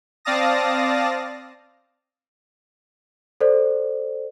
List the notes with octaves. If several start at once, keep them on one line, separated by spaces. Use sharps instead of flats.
C4 D5 F5 A5 D#6 A#6
A4 C5 D5